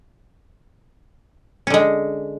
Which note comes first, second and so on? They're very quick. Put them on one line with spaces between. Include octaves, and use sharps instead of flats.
C#4 D3 G#3